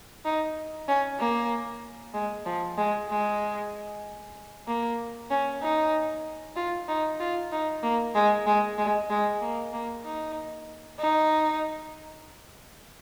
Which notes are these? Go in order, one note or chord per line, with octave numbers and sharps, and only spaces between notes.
D#4
C#4
A#3
G#3
F3
G#3
G#3
A#3
C#4
D#4
F4
D#4
F4
D#4
A#3
G#3
G#3
G#3
G#3
A#3
A#3
D#4
D#4